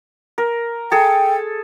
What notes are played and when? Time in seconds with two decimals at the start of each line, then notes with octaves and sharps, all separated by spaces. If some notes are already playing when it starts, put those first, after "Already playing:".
0.38 A#4
0.92 G#4 A4 G5